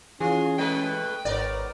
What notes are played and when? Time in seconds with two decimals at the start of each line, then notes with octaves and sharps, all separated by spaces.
0.21 E3 C#4 F4 G#4
0.58 B2 G#3 B4 G5
1.25 G#1 G#2 D#3 B3 A#4 C#5 D5